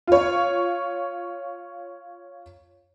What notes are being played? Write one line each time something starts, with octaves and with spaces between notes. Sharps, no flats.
F4 C#5